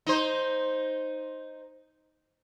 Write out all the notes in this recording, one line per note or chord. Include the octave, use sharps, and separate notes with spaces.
D#4 C5